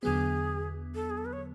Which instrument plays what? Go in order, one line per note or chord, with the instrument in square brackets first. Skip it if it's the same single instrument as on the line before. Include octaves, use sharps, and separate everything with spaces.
[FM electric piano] E2 D3 F#3 B3 [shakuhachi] G#4
[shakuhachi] A4
G#4
A4
B4
C#5